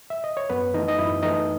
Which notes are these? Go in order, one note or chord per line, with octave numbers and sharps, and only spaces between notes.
E5
D#5
C#5
F#2 B3 B4
E3 A3 D#4 D#5
D#5
F#2 E4 E5
E3 A3 D#4 D#5